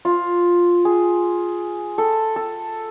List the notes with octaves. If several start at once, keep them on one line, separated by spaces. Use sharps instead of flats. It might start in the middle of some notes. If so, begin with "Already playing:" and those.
F4
G#4
A4
A4